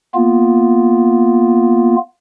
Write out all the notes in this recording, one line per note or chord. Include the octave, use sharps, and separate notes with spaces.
A#3 B3 F4